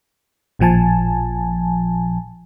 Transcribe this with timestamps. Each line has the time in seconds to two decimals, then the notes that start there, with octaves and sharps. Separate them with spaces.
0.59 A1 A#2 F3 G#5 A5